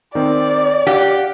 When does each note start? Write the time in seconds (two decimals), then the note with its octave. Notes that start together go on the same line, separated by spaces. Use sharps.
0.15 D#3 C4 D5
0.87 G4 F5 F#5